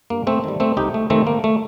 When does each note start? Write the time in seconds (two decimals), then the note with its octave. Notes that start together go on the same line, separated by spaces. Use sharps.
0.10 G2 A#3
0.27 A3 C4
0.44 D#3 G3
0.60 A3 C4
0.77 C2 D#4 G4
0.94 A3
1.10 C3 D#3 A3 C4
1.27 A#3
1.44 A3